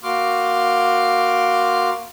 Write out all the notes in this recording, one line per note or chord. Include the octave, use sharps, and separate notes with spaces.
A#3 F#4 C6 D6 F6